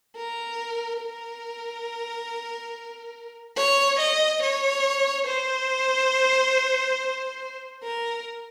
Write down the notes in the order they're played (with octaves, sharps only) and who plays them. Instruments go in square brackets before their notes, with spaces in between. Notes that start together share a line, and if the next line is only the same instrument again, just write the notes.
[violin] A#4
A#4
C#5
D#5
C#5
C5
A#4